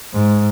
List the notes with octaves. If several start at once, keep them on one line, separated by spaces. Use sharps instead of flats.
G#2